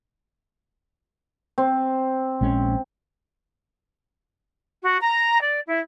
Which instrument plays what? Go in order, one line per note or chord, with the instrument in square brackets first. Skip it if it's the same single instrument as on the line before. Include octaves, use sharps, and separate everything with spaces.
[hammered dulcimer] C4
[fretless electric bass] A#1 G#3 C#4
[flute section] F#4
A#5
D5
E4